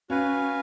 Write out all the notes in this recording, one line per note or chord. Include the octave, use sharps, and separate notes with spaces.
C#4 F#4 B4 F5 G#5